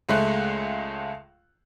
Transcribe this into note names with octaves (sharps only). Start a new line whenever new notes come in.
C#2 G#3 A3 F#6